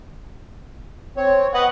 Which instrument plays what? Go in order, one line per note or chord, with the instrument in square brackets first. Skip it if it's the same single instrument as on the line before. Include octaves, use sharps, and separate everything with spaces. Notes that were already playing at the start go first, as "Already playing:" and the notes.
[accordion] C4 C#5
[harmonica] B4 F#5 [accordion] D#5